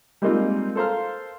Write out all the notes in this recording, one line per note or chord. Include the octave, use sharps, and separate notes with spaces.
G3 G#3 A#3 C4 D#4 F4
A4 A#4 C5 F5 A#5 F6